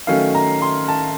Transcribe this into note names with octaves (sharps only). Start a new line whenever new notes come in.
D#3 F#3 A3 C#4 F5
A#5
C6
A5